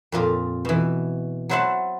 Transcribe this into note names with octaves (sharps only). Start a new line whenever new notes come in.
F2 A#2 F4 D5
B2 E3
F#3 B4 C5 E5 F#5 A5